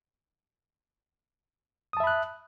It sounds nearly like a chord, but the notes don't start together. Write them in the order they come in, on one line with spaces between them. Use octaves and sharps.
D#6 A5 E5 B5 F#6